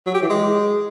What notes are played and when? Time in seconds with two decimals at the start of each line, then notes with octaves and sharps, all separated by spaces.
0.06 F#3
0.14 G4
0.22 E3
0.30 G#3